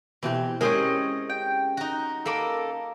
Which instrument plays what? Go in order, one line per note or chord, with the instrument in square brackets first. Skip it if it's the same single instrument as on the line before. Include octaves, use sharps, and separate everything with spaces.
[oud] B2 E3 G4 [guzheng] C4
[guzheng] G#3 [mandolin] C4 D#5 G#5 [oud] C#4 G4 A#4
[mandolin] G5
[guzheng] D#4 F#4
[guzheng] A#3 B5 [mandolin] A4 D6